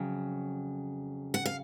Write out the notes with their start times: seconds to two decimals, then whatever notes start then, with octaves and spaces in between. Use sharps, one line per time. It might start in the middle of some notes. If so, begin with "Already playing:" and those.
Already playing: F2 C#3 F#3
1.34 F#5
1.46 F5